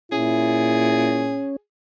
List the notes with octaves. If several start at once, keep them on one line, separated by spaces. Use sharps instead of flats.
A#2 C#4 E4 G#4